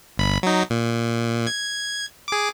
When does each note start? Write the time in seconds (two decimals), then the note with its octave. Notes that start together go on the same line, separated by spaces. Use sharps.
0.18 G1 B5
0.43 F#3 D#4
0.70 A#2
1.47 G#6
2.28 G#4 D6